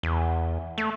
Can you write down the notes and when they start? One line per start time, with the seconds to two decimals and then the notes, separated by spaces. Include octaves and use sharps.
0.03 E2
0.78 A3